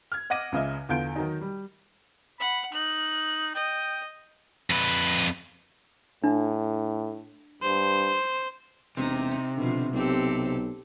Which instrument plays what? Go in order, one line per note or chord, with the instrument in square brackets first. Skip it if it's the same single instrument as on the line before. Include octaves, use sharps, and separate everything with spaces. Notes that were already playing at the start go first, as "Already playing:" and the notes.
[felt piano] F6 G#6
D#5 F#5 D6 A#6 D#7
C#2 C#3 D#5 E5
E2 D3 F4 G6 D7
D#3 F#3 D#4
G3
[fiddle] F#5 [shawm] B5
[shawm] D#4 [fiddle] F#6
[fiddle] D#5 [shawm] G5
[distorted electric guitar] F2 B4
[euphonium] A2 [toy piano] D4
[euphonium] G2 [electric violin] C5
[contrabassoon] E1 [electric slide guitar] C3 [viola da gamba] D#4
[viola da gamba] B2 F3 [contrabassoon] D3
[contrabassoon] B1 [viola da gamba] C4 G4 A4